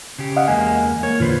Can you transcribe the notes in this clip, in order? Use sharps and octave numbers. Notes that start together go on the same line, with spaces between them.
C#3 G4
D#5 F5 F#5
E2 G#3 A#3 G#5
A#3 C#5
E2 A#2 D3 F4 B4 C5